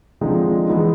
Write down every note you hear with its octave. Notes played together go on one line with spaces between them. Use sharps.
D3 F3 G#3 C4 D#4
E3 G#3 B3 D#4